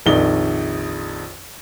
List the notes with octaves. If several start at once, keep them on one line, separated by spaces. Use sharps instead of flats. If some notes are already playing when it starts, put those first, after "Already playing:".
A#1 F2 D#3 D#4 D5 G7